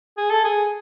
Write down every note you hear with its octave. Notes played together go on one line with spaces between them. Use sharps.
G#4
A4
G#4